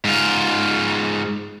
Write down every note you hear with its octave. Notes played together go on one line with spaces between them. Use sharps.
G#2 F4